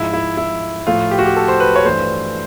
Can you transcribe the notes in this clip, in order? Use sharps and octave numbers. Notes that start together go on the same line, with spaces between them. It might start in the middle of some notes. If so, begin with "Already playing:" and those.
Already playing: G#2 F3 G#3 E4
E4
E4
A2 F3 A3 F4
G4
F#4
G4
A4
C5
B4
C#5
G2 E3 A3 C5